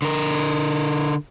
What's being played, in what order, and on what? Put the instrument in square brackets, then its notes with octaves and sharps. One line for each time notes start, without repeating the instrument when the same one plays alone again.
[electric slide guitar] D3 A#4